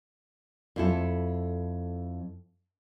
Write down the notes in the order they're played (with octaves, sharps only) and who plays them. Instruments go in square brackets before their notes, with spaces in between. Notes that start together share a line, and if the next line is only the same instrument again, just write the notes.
[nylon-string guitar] F2 E4 A4